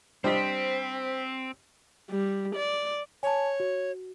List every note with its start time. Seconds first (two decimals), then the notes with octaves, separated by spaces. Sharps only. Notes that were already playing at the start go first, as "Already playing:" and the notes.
0.24 G3 C4 D4 C5 D#5 B6
2.10 G3
2.56 D5
3.23 C#5 G#5 A5
3.60 F#4